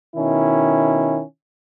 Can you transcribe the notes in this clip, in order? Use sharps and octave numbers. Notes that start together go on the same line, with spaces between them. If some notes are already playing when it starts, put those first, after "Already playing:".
B2 D#3 C#4 E4